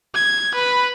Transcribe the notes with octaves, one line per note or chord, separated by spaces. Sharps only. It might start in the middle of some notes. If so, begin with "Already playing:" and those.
G#6
B4 B5